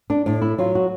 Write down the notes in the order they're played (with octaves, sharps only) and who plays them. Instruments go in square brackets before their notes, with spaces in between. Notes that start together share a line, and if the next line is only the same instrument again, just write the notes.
[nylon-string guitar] D4
A2 D4
E4
F#3 F4
F#4